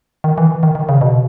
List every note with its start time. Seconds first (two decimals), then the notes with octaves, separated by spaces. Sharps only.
0.24 D#3
0.38 E3
0.63 D#3
0.75 D#3
0.89 C#3
1.01 B2